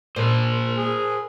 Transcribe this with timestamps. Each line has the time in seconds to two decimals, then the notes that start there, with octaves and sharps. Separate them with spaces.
0.16 A#2 A#4 C5
0.77 G#4